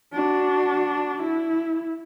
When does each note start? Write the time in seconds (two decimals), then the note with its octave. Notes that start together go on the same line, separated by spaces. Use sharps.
0.13 D4 F#4
1.23 E4